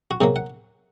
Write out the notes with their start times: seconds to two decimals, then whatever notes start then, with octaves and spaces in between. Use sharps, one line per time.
0.11 F#4
0.21 C3 F#3 A#3 G#4
0.36 F#5